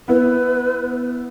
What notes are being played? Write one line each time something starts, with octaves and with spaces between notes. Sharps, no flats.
B3 E4 B4